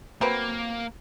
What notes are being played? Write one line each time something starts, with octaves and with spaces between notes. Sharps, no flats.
F#3 A#3 C4 B4